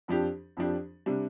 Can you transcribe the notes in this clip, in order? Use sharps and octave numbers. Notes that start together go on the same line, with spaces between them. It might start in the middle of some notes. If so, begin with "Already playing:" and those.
F2 F3 D4 G4
F2 F3 D4 G4
C3 G3 D4